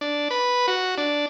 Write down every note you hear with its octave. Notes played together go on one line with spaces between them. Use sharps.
D4
B4
F#4
D4